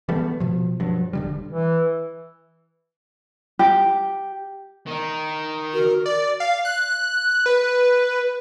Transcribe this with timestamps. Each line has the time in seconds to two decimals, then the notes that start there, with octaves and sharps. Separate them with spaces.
0.09 E3 G3 A3 B3
0.40 B2 F3
0.80 G2 F3 F#3
1.13 E1 D3 G3
1.48 E3
3.59 G4
4.87 D#3 D#4
5.74 F#4 A#4
6.06 D5
6.40 F5
6.65 F#6
7.46 B4